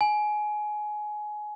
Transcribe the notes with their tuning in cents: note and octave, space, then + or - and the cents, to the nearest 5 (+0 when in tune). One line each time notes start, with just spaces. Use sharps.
G#5 +20